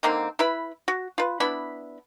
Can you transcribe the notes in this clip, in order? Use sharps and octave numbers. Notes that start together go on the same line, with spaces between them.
D3 D#3 A#3 C4
E4 B4 B5
F#4
F4 B4
B3 D4 E4 B5